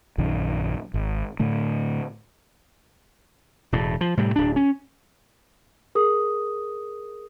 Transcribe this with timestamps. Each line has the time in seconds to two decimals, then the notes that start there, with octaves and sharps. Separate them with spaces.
0.18 A#1 F#2 D#3
0.94 G#1
1.40 A2 D3 A3
3.72 E1 A2
4.01 F3
4.17 A2 C3 G3
4.36 D1 D4
4.56 C#4
5.95 G#4 A#4 D#6